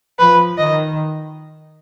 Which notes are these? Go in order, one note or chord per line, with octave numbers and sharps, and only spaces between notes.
F3 B4
D#3 D#5